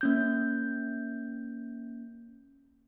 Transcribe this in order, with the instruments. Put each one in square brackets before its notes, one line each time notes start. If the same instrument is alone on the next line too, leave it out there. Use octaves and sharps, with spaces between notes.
[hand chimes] A#3 C#4 G6